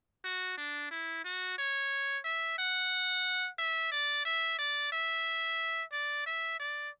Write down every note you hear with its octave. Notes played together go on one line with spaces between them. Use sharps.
F#4
D4
E4
F#4
C#5
E5
F#5
E5
D5
E5
D5
E5
D5
E5
D5